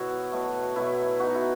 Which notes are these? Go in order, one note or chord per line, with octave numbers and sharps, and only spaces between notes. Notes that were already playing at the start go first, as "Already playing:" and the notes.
Already playing: B2 F#3 B3 E4 F#4
B2 F#3 A3
B2 F#3 A3 E4
F#3 B3 D#4 F#4
E4